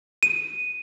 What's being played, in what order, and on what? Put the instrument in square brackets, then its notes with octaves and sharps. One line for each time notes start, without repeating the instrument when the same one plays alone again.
[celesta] D#7